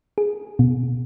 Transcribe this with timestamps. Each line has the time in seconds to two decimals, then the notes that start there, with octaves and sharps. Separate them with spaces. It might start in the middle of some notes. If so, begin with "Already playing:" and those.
0.18 G#4
0.59 B2